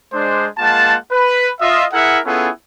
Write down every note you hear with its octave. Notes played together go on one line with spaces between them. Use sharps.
G#3 D4 C5
G#3 A#3 F4 F#5 A5
B4
F4 D#5 E5
E4 G#4 A#4 E5 F#5
B3 C#4 E4 F4 G#4 A4